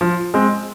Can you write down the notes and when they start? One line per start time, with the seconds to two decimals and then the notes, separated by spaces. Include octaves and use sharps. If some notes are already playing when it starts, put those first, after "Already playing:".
0.01 F3
0.34 G#3 C4